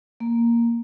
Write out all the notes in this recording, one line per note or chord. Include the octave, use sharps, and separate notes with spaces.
A#3